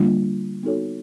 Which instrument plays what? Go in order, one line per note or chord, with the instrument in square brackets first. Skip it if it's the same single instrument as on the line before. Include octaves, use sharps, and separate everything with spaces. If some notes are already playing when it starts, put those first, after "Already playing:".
Already playing: [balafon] D3 G3 A#3 D4 F4
B3 D#4 F#4 A4 C#5